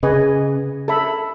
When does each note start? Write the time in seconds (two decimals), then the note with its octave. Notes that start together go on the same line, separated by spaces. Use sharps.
0.03 C#3 G#4 B4 D#5 G#5
0.88 A4 E5 B5